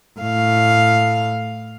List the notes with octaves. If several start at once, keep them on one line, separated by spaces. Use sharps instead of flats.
A2 F5